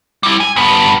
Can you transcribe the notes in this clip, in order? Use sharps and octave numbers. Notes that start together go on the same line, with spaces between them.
G3 E4
G#5
G2 B3